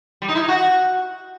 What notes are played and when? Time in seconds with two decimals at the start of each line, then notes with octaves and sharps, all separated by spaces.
0.22 G3
0.28 D#4
0.35 E4
0.42 D#4
0.48 F#4